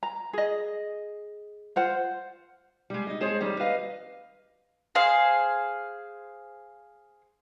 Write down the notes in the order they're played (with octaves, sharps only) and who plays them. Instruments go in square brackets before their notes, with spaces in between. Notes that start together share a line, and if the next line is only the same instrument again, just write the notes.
[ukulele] A#5
G#4 D#5
F4 C5 F#5
[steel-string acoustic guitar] G3 G#3
D#4 D#5
F2 G#3 C4 G#4 C5 C#5
D#3 G3 C4
B4 D#5 F5
[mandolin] G#4 C5 F5